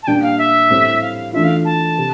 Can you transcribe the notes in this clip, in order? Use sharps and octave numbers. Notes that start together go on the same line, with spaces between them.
A5
A#2 G3 D4 G4 G5
F5
E5
A2 G3 C4 E4
F5
E3 A3 D4 F4 E5
F5
A5
C3